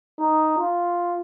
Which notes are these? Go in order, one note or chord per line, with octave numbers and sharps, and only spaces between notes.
D#4
F4